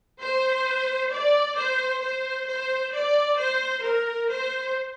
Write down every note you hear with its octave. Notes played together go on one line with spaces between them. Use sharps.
C5
D5
C5
C5
C5
D5
C5
A#4
C5